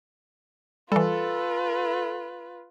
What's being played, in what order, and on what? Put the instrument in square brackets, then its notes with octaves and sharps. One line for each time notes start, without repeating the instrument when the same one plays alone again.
[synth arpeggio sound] E3 G3 [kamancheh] F4 B4 [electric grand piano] A4